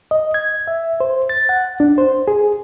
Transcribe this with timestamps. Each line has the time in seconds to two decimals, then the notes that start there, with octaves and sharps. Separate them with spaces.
0.11 D#5
0.34 G#6
0.68 E5
1.00 C5
1.29 A6
1.49 F#5
1.80 D4
1.98 C5
2.28 G#4